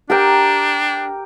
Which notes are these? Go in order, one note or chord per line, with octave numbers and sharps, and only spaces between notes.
D4 G4 A#4 G5